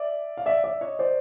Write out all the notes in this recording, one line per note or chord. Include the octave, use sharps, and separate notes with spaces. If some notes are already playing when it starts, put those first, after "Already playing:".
Already playing: D5 E5
F5
D5 E5
D5 E5
C#5 D#5
C5 D5